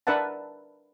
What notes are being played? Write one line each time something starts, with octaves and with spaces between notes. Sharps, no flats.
D4 A#4 B4 E5 F#5 A5